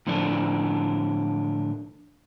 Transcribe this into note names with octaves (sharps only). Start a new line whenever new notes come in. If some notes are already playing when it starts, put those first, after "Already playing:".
A2 D3 F3 D4 D5